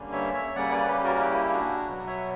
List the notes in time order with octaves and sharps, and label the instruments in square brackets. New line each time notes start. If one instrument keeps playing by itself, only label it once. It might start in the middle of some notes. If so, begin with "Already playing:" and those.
Already playing: [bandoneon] G2 D3 G3 A#3 C#4
C#5 E5
C#5 E5
C#3 G3 A#3 C#4 D5 F#5
B4 D5
G4 B4
F#4 A#4
A#4
E4 G4
D4 F#4
B2 F#3 B3
C#5 E5